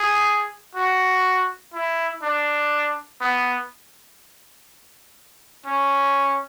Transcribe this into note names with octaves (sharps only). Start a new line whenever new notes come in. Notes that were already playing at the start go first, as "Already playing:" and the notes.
Already playing: G#4
F#4
E4
D4
B3
C#4